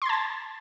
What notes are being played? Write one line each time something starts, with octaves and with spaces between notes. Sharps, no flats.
A5 C6 G#6 A6